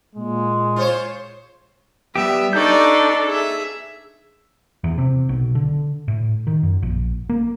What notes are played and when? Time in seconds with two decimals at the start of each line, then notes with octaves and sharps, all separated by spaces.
0.15 A#2 G#3
0.76 F4 C5 C#5
2.16 G3 B3 G4 E5
2.53 D4 D#4 A4 D5 C#6 G6
3.26 G#4 E5
4.84 E2
4.98 C3
5.29 B1
5.55 D3
6.08 A2
6.47 D#3
6.63 F#2
6.83 A#1
7.29 A#3